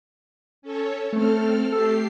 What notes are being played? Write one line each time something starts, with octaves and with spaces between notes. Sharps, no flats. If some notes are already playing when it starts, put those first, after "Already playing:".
C#4 A4 C#5
A3 C4 A4 F6
A3 G4 A4 C7